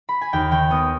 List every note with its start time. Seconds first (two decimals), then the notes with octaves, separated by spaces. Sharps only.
0.09 B5
0.21 G#5
0.33 D#2 G5
0.51 D#3 G5
0.70 B3 D#6